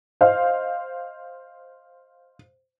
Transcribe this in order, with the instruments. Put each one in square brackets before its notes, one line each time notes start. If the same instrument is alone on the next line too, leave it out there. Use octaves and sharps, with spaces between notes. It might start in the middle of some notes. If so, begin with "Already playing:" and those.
[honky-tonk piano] C5 D#5 F5